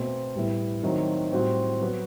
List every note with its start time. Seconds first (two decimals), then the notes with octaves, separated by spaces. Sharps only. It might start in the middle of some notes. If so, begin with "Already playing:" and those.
Already playing: B2 A3 C4
0.35 A2 G3 B3 E4
0.83 D#3 F#3 A3 C4
1.32 A2 G3 C4 F#4
1.81 F#3 B3 F#4